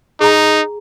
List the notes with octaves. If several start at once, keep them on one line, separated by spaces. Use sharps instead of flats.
D#4 G#4 G#5 A#5